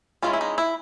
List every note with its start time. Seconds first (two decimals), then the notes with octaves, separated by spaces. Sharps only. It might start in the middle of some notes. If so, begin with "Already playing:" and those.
0.22 E3 G#3 C#4 F4
0.33 E4
0.41 D#4
0.58 E4